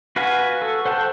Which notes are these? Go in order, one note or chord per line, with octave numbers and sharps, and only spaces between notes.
F#4 B4 F5 F#5 G#5
A4 C#6
C5 F#5 G5 A5